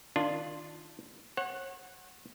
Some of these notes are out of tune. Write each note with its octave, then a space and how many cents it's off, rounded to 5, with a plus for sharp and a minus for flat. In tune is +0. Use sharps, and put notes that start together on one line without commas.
D#3 +0 D4 +0 F4 -5
C#5 -40 F#5 +0